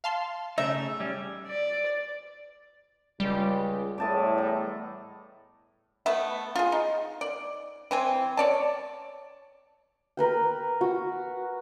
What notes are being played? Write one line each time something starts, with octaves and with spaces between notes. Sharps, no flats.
F5 A5 C6
C#3 A3 D#4 E5
G3 C#4
D5
C#2 G3
E2 A2 D#5 A5 D6
A#5
A3 B3 E5
F4 G#4
D#4
D5
E3 C4 G#5
C#5 D5 A5
A#4 B4 G5
F#4